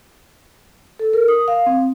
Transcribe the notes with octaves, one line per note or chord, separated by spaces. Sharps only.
A4
A#4
D#6
F5
C4